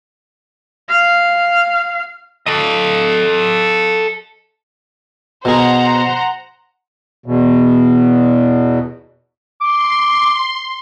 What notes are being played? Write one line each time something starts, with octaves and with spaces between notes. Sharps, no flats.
F5
A4 D#5
B2 G#4 C5 F#5 A#5
E2 B2
C6 D6